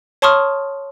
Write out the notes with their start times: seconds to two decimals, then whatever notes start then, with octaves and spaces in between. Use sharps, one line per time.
0.22 C#5 A5 C6 C#6 D#6 F6